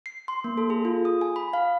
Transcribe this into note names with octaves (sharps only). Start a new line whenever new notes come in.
C7
C6
A#3
A4
G#4
F4
D#6
G#5
B5
F5